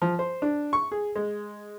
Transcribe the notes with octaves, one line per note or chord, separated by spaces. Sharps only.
F3
C5
D4
C#6
G#4
G#3